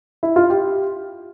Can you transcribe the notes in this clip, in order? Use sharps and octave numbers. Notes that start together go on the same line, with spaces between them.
E4
F4
G4